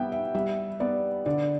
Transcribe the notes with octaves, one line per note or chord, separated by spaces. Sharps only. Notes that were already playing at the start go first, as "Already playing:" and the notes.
Already playing: G3 B3 E5 G5
E5
G3 E5
B3 D5
D3 D5